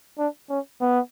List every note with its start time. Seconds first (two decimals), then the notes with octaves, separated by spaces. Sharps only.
0.18 D4
0.50 C#4
0.81 B3